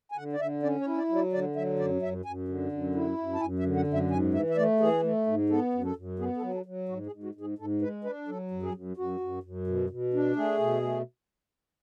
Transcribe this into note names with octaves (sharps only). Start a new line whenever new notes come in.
G#5
D3 F#5
D5
D3 E5
C#4 D5
C#5
E4
D5
F#3
D5
D3 D5
F#3 E5
F#2 D5
F#2 E5
F#2 G#5
D3
F#2
E4
F#2
A5
F#2 G#5
E5
D3
F#5
F#2
E5
G#2 G#5
E3 E5
E5
A3 D5
E3 G#4
A3
G#2
B3 A4
F#2
A4
F#2
B3 G#4
A4
F#3
A4
F#3
G#2 F#4
G#4
G#2
F#4
G#2
G#4
G#2 A4
G#3 B4
D4 B4
F#3 A4
F#2
G#4
F#2
F#2 F#4
F#2
F#2
B2
B2
D4
A3 G#4
B2
A3